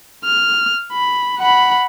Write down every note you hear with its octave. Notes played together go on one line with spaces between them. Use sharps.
F6
B5
F#5 B5